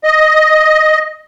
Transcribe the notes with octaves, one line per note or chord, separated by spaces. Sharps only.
D#5